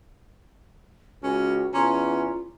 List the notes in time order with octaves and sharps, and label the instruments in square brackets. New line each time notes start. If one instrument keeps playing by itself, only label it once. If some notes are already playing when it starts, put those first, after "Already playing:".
[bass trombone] C#2 [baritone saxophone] C#4 [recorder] F#4
[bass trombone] E2 [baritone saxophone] C#4 [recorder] F4 [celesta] A#5 C6 D6